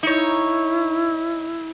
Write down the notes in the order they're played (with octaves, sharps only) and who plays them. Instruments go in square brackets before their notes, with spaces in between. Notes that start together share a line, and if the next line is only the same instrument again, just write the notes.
[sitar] D#4 C#5 [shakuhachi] E4